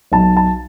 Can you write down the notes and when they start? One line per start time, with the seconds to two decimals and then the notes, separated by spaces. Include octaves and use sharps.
0.12 B1 A5
0.37 A5